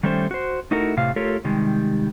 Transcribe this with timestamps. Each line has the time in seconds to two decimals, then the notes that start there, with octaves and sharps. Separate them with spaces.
0.03 D#3 G3 A3 C#4 C5
0.31 F#4 C5
0.71 A3 D#4 E4 F#4 A4 A#4
0.97 A2 C3 F5
1.16 A3 F4 G4 A4 A#4 C#5
1.44 C3 D#3 G3 G#3